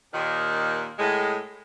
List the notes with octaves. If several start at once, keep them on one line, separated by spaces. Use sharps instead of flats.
D#2 A#2 D#3
A2 G#3